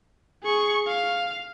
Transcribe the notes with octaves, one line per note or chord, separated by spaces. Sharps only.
G#4 C#6
F5